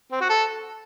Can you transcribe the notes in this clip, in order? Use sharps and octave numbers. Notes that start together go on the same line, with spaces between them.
C4
F#4
A4